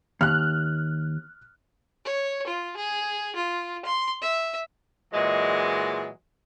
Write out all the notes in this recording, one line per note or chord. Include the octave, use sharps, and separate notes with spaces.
D#2 F6 F#6
C#5
F4
G#4
F4
C6
E5
A#2 E3 F#3 G#3